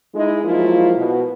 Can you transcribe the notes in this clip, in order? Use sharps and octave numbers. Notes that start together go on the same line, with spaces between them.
G#3 D#4 E4
F3 F#3 G#3 A#3 E4 F4
B2